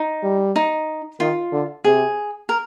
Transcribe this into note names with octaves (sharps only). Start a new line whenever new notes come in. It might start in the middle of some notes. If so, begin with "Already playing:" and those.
Already playing: D#4
G3
D#4
D#3 F4
D3
C3 G#4
A#4